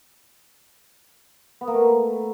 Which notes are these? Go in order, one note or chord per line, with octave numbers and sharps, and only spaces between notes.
B3
A#3
A3